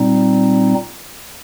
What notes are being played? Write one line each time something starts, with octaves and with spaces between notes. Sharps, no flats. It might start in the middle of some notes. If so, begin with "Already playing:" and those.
Already playing: A#2 G3 C4 D#4